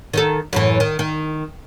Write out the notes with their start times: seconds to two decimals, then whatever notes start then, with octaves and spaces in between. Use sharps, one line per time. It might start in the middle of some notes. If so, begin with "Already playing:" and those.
0.14 D#3 D#4 A4
0.53 F#2 A2 E3
0.80 D#3
0.99 D#3